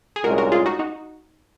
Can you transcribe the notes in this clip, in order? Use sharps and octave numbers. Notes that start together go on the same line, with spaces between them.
G#4
C2 A#2 G#3 C#4 F#4 A#4
F#4 A#4
F4 G#4
D#4 F#4
D#4 F#4